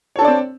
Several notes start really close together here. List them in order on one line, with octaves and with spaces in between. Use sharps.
C#5 A4 D4 D5 C4